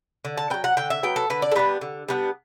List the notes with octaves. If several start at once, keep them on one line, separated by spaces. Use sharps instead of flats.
D3
A5
F#3 B3 G5
F#5
D3 G5
E5
F#3 B3 G5
A4
D3 B4
D5
A4
G3 B3 D4 B4
D3
G3 B3 D4